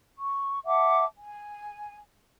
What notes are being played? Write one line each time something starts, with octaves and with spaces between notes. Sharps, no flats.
C#6
E5 F#5 A5 D6
G#5